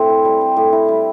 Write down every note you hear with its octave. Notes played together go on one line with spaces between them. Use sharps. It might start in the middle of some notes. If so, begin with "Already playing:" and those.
Already playing: A2 C4
E4
G3
C4
A2
E4
G3